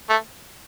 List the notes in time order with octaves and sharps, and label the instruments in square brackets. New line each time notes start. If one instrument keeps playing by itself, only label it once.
[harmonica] A3